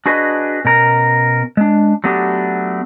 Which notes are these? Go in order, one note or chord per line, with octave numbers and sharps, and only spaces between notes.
D4 F#4 G#4 B4 D#5
B2 C#4 A#4
G#3 D4
F#3 A3 B3 D4 G4